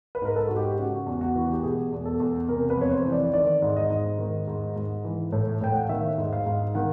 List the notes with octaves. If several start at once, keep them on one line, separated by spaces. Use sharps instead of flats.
B4
G#2 A#4
A4
G#2 F#4
G4
C#3 F#4
E2
F#4
E3
G4
B2 G#4
E2
A4
E2
C3 A#4
B4
F2 C#5
C5
E3
D5
D#3 D5
G#2
D#5
G#2
D#3
G#2
G#2
E3
A2
A2 G5
F#5
F5
D#3 E5
G#2
F5
G#2
D#3 F#5